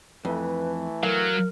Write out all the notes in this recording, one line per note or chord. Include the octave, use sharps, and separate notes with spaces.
F2 E3 A3 B4
F#3 A#4 F5